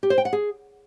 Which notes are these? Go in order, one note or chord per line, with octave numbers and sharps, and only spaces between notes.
G4
C5
G5
F#5
G#4